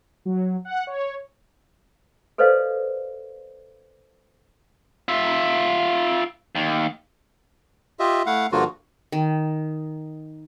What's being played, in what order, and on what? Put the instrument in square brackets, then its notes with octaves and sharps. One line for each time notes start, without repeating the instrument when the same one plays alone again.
[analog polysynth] F#3
F#5
C#5
[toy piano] A4 B4 C5 D5 D#5 F5
[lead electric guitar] F4 E5
D#2
[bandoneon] F4 G4 D#5 E5
A3 E4 F5 F#5
G2 D3 F3 A#3 F4 F#4
[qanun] D#3